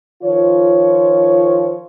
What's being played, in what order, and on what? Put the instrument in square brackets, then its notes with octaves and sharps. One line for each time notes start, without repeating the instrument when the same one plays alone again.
[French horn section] D#3 F3 F4 C#5